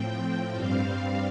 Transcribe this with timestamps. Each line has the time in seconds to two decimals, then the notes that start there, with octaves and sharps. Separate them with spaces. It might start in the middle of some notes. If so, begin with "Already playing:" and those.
Already playing: A2 F3 C4 G5
0.53 G2 G3 C4 F5